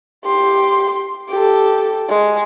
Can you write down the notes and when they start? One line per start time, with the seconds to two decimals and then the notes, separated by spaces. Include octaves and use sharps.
0.25 G4 C6
1.30 G4 A4
2.09 G#3